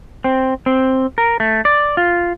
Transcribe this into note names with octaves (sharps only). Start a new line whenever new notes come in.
C4
C4
A#4
A3
D5
F4